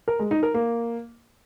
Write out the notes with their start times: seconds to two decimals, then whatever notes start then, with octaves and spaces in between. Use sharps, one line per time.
0.08 A#4
0.19 G#3
0.31 D#4
0.43 A#4
0.54 A#3